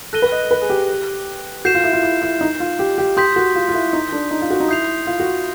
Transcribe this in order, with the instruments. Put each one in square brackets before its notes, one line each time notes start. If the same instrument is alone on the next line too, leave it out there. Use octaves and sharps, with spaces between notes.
[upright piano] A4 [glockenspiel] F#6 A#6 D#7 G7
[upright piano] B4
D#5
B4
G#4
G4
[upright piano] F#4 [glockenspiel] G6 C7 E7
[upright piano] F4
E4
F4
E4
E4
D#4
F4
G4
G4
[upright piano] G4 [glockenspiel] C6 D#6 G6 B6
[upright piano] F#4
F4
F4
E4
D#4
D4
D#4
F4
F#4
D#4
[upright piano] E4 [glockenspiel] D#6 G6 C7 F7
[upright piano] F4
F#4